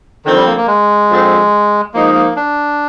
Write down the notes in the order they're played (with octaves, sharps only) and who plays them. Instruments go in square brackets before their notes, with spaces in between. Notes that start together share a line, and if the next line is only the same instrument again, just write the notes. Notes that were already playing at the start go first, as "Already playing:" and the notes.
[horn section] D3 F3 C4 [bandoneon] D#3
[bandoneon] G3
A#3
A#3
G#3
[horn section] D3 F3 C4
[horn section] F3 G#3 D#4 [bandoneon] A#3
[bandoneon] A#3
D4